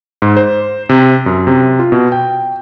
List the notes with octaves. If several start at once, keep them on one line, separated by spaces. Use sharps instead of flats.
G#2
C5
C3
F#2
C3
F4
B2
G5